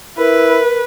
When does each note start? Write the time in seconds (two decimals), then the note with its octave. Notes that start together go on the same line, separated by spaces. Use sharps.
0.18 E4 A#4 B4